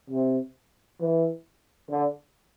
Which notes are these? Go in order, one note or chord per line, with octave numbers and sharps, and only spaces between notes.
C3
E3
D3